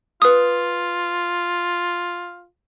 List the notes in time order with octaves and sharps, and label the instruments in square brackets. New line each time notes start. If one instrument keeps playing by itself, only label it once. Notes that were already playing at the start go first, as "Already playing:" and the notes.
[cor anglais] F4 [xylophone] B4 D#6